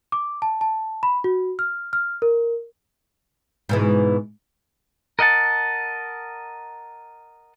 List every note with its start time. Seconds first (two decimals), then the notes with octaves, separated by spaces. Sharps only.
0.12 D6
0.42 A5
0.61 A5
1.03 B5
1.24 F#4
1.59 F6
1.93 F6
2.22 A#4
3.69 G#2 B2 E3
5.19 A#4 D#5 F#5 A5